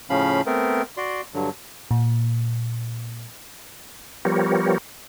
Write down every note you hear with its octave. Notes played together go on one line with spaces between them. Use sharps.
A2 C#3 F3 C#4 F5 B5
A3 B3 C4 A#4
F#4 D5 C6
G2 D3 F#3
A#2
F3 G3 B3 G4 A#4 C#5